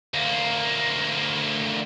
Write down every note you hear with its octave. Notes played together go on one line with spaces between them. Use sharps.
D2 A#3